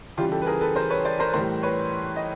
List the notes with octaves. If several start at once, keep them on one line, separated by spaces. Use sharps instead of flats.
C#3 E3 G3 F4 G4
G4 A4
B4
G#4 A#4
A4 B4
A#4 C5
B4 C#5
C5 D5
A#4 C5
A2 E3 G3 A#4 C5
B4 C#5
D#5